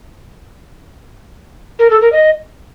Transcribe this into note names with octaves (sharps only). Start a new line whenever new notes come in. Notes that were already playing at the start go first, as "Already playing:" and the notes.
A#4
A4
A#4
D#5